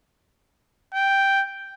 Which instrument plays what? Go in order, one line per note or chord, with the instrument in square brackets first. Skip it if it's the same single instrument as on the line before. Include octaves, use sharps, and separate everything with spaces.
[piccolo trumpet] G5